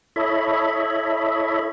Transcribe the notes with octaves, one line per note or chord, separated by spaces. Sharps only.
E4 A4 C#5 D#5 E5 B5